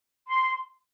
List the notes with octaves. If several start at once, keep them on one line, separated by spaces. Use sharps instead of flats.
C6